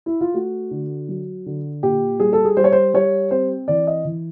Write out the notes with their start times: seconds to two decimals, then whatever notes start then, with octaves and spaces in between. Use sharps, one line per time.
0.06 E4
0.21 F4
0.34 A3 F#4
0.71 D3
1.09 F#3
1.46 D3
1.83 A#2 G4
2.20 G3 G#4
2.33 A4
2.45 G#4
2.57 G3 C5
2.64 C#5
2.72 C5
2.94 G3 C#5
3.31 C4 C5
3.68 E3 D5
3.87 D#5
4.05 E3